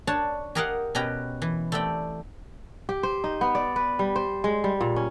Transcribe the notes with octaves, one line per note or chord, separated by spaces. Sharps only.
D4 C#5 A5
G4 G#4 A#4 D#5 F5 F#5
B2 C#4 G4 B4 G5 A#5
E3
A3 C4 G4 D5 G5
G4
C5
D#4
B3
D5
B4
G3
C5
G#3
G3
A#2
C#4